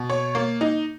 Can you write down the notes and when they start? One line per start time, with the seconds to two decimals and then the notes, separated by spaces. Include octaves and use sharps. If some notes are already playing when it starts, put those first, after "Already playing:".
Already playing: B2
0.10 C#5
0.35 A#3
0.61 D#4